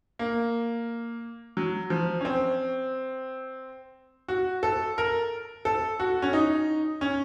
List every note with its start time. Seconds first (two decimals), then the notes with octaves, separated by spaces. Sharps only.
0.19 A#3
1.57 F#3
1.90 F3
2.21 C#4
2.25 C4
4.28 F#4
4.63 A4
4.98 A#4
5.65 A4
6.00 F#4
6.22 C#4
6.33 D#4
7.01 C#4